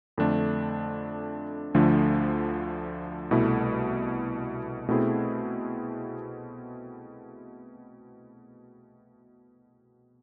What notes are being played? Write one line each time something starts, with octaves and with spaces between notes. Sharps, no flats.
F2 D3 A3 D4
D2 D3 F3 A3
C2 B2 A3 E4
B2 A3 C4 E4 G#4